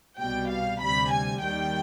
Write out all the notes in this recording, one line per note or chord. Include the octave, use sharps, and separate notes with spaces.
C2 B2 G3 G5
F5
D2 C3 G3 B5
G#5
D#2 D#3 G3 G5